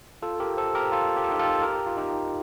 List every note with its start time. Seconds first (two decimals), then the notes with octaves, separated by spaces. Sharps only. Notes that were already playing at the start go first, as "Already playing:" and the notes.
0.22 F4 A4
0.40 G4 A#4
0.57 A4 C5
0.75 G4 A#4
0.92 F4 A4
1.16 G4
1.24 A4
1.31 D#4 G4
1.39 F4 A4
1.62 G4 A#4
1.87 F4
1.97 D#4 G4